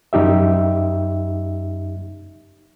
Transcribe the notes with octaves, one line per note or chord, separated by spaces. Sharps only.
F#2 D#4 G4 E5